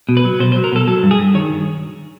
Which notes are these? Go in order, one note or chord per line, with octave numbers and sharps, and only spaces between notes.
B2
B4
F#3
B2 C5
C5
F#3
A#4
B2 A4
F#3 A4
G2
G#4
G2
D#3 C#5